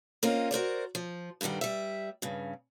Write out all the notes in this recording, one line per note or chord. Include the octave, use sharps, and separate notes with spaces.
A#3 C4 C#4 F4 A#4 D#5
F#4 A#4 C5 D5
F3
G2 B2 D3 D#3 G3
G3 E5
G2 C#3